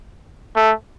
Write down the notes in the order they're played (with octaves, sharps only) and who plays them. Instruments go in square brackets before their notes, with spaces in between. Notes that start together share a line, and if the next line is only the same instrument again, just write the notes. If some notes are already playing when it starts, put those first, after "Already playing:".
[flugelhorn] A3